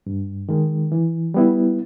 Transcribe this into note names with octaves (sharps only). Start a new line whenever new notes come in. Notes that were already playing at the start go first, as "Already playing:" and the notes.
G2
D#3 G#3
E3
G3 B3 E4